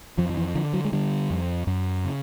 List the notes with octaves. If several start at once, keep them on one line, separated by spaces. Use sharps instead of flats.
F2 F3
F3
E3
D3 F3
F#3
G#3
D3 G3
F2
F#2
C#3